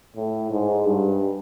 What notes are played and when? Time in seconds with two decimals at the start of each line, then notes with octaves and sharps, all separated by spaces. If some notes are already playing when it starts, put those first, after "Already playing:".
0.16 A2
0.51 G#2
0.86 G2